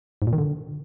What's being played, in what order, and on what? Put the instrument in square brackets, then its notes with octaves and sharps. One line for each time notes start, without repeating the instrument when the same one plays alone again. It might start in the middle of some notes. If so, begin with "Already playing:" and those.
[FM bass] G#2
A#2
D#3
D3